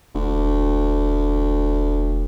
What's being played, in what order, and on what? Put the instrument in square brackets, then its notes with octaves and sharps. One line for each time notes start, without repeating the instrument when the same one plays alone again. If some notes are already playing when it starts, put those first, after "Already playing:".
[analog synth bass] E1 [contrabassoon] D2